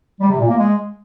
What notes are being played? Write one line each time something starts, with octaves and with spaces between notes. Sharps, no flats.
G3
C3
A#2
A#3
G#3